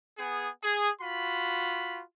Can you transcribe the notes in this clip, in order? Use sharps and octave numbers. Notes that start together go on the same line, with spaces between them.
B3 G#4
G#4
F4 F#4 B5